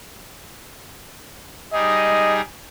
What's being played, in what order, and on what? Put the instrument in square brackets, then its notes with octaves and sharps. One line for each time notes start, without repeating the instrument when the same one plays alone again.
[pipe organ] G3 D#4 G#4 [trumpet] D#5